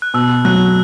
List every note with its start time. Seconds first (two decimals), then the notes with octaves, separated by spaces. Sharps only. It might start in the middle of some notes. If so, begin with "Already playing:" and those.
0.02 F#6
0.14 B2 E6
0.45 F#3 F#6